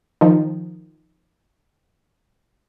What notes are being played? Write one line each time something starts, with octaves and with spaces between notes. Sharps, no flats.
D#3 F3